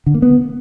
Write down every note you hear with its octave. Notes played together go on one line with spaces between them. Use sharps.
D3
A#3
B3